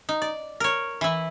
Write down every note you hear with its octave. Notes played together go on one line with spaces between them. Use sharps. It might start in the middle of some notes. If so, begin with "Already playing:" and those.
D#4
D5
A#4 C#5
E3 E4